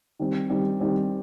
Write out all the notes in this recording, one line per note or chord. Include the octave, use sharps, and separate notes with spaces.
D#3 G3 C4
D#3 G3 C4
D#3 G3 C4